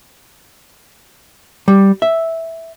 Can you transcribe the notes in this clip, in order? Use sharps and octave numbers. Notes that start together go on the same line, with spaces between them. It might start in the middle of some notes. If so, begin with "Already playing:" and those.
G3
E5